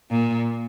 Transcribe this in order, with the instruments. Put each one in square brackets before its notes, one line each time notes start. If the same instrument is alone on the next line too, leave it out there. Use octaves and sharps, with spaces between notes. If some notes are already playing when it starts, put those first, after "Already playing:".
[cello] A#2